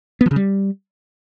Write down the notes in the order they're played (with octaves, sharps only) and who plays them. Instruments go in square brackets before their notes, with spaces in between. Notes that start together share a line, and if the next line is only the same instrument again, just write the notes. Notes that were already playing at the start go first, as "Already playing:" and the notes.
[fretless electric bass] B3
F3
C#3
G3